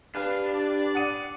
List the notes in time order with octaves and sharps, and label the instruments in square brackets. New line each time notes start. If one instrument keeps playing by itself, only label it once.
[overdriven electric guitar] D4 [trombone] G4 [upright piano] B4 [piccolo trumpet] F5
[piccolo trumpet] D5
[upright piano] F#5 D#6 D#7